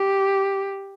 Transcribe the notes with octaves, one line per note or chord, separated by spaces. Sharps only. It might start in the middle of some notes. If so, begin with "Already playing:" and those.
Already playing: G4